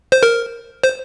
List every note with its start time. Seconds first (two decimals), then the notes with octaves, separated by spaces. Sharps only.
0.12 C5
0.23 A#4
0.83 C5